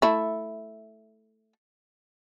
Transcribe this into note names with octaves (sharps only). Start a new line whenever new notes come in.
A3 E4